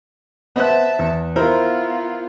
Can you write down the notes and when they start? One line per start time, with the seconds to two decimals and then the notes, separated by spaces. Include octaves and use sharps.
0.56 B3 C5 E5 A5 F#6
0.99 E2
1.36 B3 E4 F4 A#4 C5